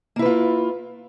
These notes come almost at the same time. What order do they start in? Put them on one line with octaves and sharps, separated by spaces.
A#3 E4 B4 F4